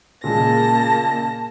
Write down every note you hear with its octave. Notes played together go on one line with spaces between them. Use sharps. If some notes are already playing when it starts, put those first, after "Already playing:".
A#2 C#3 G#3 A#3 A5 A#6